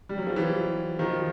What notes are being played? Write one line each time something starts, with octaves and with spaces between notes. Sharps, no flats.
G3
F#3
F3
E3 F#3
D#3 F3